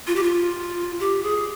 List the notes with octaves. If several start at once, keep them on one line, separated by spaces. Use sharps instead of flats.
F4
G4
F4
G4
G#4